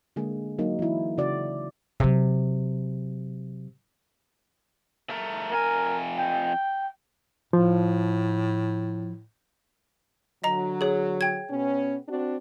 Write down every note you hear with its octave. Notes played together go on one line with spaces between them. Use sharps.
D3 G#3 A#3 G#4
F#3 A#3 D#4
E3 E4
C#3 F#4 D5
C3 F#3
A3 A#4
F2 A#4 G#5
G5
A2 F3
D3 F#3 D#5 A#5
G#4 C#5
G5 G#6
B2 B3 C#4
C4 D4 F#4